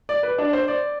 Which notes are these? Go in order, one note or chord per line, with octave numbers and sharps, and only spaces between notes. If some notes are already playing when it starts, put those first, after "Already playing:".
D5
B4
D4
C5
D5